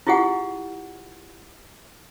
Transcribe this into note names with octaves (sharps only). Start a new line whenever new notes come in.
E4 F4 G4 G#4 F#5